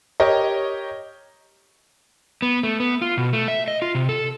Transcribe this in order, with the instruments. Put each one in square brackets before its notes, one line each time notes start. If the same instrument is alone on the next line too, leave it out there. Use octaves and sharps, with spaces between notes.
[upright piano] G4 A#4 C#5 D#5
[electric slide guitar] B3
A3
B3
F4
B2
A3
E5
D#5
F4
C3
A4